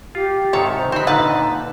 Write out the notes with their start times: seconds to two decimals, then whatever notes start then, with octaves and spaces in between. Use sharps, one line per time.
0.15 F4 G4
0.53 G#2 C3 D#3 A4 C#5
0.75 C5
0.92 D3 C4 D#4 C5 B5
1.07 A#2 D3 B4 F#5 A5